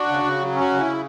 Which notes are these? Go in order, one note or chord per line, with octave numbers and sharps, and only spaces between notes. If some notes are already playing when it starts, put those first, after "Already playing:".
Already playing: D4 F#4
C#3
C#3
F#3
C#4
F#4
C#3
E4
C#3